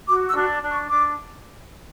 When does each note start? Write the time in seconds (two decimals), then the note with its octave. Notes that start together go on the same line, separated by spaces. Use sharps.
0.07 F#4 D6
0.28 E6
0.36 D4
0.49 D6
0.63 D4
0.70 C#6
0.90 D4 D6